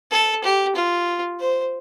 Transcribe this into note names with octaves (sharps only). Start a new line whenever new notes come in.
A4
G4
F4
C5